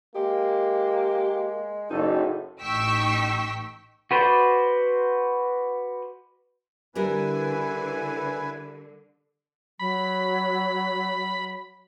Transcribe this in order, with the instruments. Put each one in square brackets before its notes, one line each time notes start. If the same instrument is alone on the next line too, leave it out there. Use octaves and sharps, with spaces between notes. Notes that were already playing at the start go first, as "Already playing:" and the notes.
[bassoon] G#3 [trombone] A#3 [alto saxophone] G4
[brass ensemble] F#1 [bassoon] A2 [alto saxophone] D#4 [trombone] A4
[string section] A1 D#4 G5 C#6 E6 B6
[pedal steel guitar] F#4 B4 C5 D5
[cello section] D3 [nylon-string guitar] G3 D4 A#4 [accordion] E4 B4 G#5
[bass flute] F#3 [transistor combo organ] B5